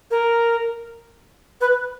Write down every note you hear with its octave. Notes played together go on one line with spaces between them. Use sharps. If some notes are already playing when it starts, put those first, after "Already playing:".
A#4
B4